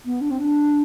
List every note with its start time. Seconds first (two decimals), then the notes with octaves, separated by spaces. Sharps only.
0.06 B3
0.21 D4
0.31 C4
0.39 D4